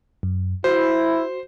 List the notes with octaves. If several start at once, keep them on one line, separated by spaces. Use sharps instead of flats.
F#2
E4 F#4 C5